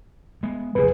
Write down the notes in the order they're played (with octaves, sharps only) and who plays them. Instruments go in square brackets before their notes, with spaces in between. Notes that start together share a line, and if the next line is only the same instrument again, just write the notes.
[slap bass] G#3 B3
[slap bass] F1 E2 A#2 [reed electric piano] G#4 B4